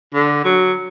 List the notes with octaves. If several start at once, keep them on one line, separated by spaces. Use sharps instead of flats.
D3
F#3